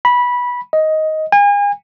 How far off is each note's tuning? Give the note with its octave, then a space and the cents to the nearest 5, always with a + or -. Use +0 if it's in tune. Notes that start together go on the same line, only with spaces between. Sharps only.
B5 -15
D#5 +10
G#5 -35